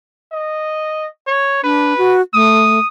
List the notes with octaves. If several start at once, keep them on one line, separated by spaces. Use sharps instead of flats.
D#5
C#5
D4 B4
F#4
A3 D#6